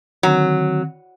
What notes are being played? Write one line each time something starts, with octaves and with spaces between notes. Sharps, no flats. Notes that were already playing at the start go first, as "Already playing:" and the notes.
D3 D#3 F#3 C4